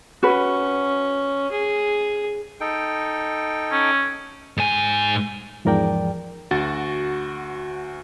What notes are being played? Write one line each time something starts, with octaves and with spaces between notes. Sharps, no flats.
C#4 F#4 B4
G#4
D#4 A4 G5
C#4
G#2 G#5
E2 G#2 F3 A#4 D5 G5
D2 F#4 A6